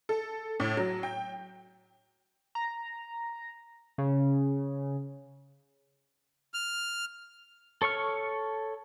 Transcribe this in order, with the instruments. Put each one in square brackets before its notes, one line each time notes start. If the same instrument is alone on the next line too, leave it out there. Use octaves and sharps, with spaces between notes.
[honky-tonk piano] A4
A2
F#3
G5
[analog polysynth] A#5
C#3
[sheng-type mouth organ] F6
[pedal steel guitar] A4 C#5 C#6 F6